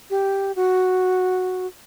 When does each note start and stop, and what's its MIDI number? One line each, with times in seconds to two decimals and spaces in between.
0.10 0.52 67
0.56 1.67 66